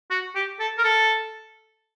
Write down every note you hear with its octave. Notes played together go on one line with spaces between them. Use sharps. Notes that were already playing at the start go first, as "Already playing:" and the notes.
F#4
G4
A4
A#4
A4